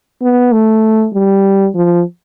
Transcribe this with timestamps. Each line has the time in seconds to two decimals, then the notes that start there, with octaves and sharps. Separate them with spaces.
0.22 B3
0.52 A3
1.14 G3
1.75 F3